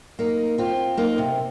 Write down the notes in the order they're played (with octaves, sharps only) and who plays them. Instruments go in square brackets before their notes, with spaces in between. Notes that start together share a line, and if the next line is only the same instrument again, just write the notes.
[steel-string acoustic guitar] A#3 D#4
C4 F4
A#3 D#4
C3